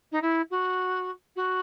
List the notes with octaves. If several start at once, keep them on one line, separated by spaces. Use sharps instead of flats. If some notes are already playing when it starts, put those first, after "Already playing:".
D#4
E4
F#4
F#4